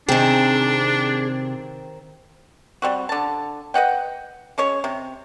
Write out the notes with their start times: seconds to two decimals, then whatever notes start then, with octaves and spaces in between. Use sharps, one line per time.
0.09 C3 D#3 C4 D4 G#4 G5
2.82 G3 C4 F#4
3.09 D3 A5
3.74 B4 D#5 F#5 G5
4.58 G#3 C#4 C#5
4.84 C3